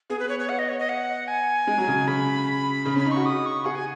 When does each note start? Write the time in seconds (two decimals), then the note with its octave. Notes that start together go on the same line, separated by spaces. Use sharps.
0.10 B3 G#4
0.19 B4
0.29 C#5
0.40 C#5
0.49 F#5
0.59 D#5
0.69 C#5
0.79 D#5
0.89 F#5
1.28 G#5
1.67 G#3
1.78 F#3
1.87 C#3
2.07 C#3 B5
2.85 C#3
2.96 C#4 B5
3.05 D#4
3.11 F#4 C#6
3.26 D#6
3.46 C#6
3.65 G#4 F#5
3.75 G#5